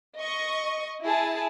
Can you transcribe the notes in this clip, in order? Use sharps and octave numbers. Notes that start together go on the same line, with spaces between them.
D#5 C#6
E4 G#4 A5